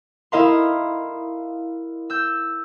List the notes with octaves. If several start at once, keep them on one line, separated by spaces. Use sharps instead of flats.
E4 A#4 D#5 F5 A#5 C6
E6 G6